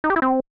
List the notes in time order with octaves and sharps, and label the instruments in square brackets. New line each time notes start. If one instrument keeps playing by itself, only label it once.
[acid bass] D#4
G4
E4
C4